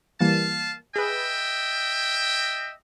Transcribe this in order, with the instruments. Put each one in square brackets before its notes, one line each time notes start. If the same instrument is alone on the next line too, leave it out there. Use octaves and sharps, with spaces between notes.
[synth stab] E3 G3 A#3 [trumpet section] F5 A5
[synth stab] G#4 B4 [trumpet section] D#5 E5 G5